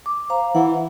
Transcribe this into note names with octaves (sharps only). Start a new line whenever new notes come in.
D6
C5 F5 A#5
E3 F#5